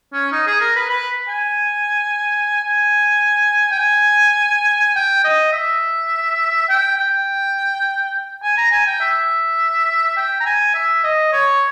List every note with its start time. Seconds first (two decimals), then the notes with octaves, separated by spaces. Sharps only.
0.13 C#4
0.32 D#4
0.47 G#4
0.61 A#4
0.76 B4
0.90 B4
1.28 G#5
2.63 G#5
3.71 G5
3.79 G#5
4.96 G5
5.24 D#5
5.53 E5
6.69 G5
6.98 G5
8.42 G#5
8.57 A#5
8.72 G#5
8.87 G5
9.01 E5
10.17 G5
10.40 A#5
10.46 G#5
10.74 E5
11.04 D#5
11.32 C#5